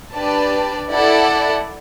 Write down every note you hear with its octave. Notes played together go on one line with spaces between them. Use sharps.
D4 G4 B4 D5 A5
E4 A4 D5 F#5